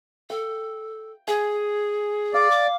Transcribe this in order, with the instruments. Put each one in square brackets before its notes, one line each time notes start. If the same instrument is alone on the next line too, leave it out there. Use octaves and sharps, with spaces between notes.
[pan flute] A4 [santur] G5
[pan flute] G#4 [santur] G#5
[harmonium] D5 [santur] F5
[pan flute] D6